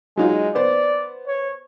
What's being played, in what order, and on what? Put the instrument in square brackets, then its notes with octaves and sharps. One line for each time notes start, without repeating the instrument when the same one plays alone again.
[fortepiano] F#3 D#4 F4 [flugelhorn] G#3
[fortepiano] B3 C5 [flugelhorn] D5
[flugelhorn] C#5